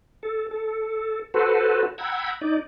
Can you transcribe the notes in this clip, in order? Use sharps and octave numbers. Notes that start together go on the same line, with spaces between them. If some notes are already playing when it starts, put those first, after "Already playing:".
A4
A4
F#4 A4 B4 C5
F#5 G5 A#5 B5 E6 G#6
D#4 D5